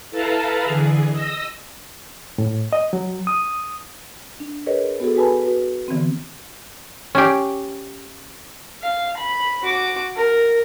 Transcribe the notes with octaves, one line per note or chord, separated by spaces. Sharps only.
E4 A4 B4 F5 A5 A#5
D3 E3 G#4
D#5 D#6 E6 A#6
A2
D#5
F#3
D#6
D4
G#4 A#4 B4 C#5 D#5
B3 F#4 G#4 A4
F#4 B4 G#5 A5 B5
F#4 B4
D3 E3 B3 C4
C#4 G4
F5
B5
F#4 D6
A#4